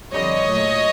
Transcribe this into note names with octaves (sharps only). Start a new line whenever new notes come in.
F2 D3 G3 C#5 D#5
A#2 F#3 A3